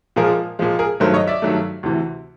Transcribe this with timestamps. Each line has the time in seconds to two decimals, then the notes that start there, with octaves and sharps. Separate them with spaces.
0.16 A#2 F3 G#3 G#4 A#4
0.59 A#2 F3 G#3
0.79 G#4 A#4
1.00 G2 D#3 F#3 A3 A#4 C5
1.14 C#5 D#5
1.27 D5 E5
1.42 G2 D#3 F#3 A3
1.83 D2 C3 E3